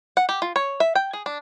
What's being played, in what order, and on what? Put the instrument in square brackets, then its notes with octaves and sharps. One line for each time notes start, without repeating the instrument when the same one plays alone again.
[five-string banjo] F#5
G4
F4
C#5
E5
G5
G#4
D4